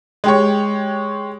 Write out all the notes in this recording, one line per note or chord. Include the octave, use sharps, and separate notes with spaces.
G#3 G4 C#5